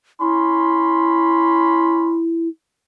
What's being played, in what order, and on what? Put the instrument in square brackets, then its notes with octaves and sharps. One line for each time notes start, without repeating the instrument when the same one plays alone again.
[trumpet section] C#4 B5 C6 [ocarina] E4